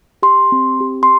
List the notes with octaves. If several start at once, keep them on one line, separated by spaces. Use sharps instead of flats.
G4 C6
C4
G4
C6